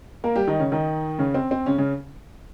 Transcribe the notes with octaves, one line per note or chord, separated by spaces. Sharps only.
A#3 A#4
G3 G4
D#3 D#4
C#3 C#4
D#3 D#4
C#3 C#4
C4
C4
C#3 C#4
C#3 C#4